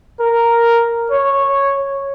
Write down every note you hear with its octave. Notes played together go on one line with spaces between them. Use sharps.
A#4
C#5